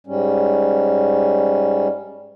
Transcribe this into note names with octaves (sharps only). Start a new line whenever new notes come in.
G#2 G3 C#4